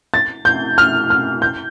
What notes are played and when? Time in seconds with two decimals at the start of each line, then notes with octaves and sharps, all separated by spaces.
0.14 A6
0.45 G6
0.78 F6
1.10 F6
1.42 G6